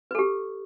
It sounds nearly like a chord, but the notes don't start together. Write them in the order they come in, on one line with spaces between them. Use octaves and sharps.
B4 A4 G4